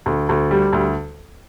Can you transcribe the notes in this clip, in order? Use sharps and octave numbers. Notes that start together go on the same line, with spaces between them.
D2
D2
G3
D2